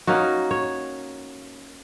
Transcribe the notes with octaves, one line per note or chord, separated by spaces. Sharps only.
A#3 C#4 D#4 F#4
C#5